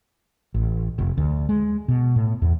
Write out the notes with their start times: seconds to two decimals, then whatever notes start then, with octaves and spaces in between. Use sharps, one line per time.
0.54 A1
0.98 F1
1.17 D2
1.49 G#3
1.88 B2
2.16 A2
2.42 E2